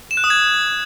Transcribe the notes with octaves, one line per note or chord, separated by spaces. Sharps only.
E7
F#6
D#6
G#6